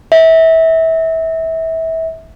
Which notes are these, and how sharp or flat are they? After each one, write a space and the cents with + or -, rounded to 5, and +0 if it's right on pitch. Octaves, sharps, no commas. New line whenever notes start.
E5 -25